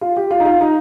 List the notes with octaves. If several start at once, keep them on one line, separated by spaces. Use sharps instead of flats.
F4
G4
F4
D#4
F4
D#4